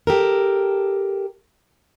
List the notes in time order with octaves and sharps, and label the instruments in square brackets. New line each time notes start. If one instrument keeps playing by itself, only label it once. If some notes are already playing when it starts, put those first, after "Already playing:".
[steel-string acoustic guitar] G4 A4 A#4